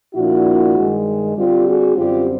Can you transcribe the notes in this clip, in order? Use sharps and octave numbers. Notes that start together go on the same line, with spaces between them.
A#2 F3 A#3 D4 E4 F#4
G2 D#3 G#3
D3 G3 C4 F4 G4
F#4 G#4
F#2 D3 G3 C4 F4 G4